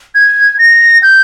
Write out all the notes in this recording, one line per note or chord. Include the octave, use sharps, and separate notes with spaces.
G#6
A#6
G6